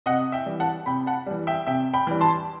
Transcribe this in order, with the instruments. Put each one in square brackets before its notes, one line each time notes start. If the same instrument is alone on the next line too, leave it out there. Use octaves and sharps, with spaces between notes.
[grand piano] C3 D#5 F#5
E5 G5
E3 G3
F#5 A5
C3 G5 B5
F#5 A5
E3 G3
E5 G5
C3 E5 G5
G5 B5
E3 G3
A5 C6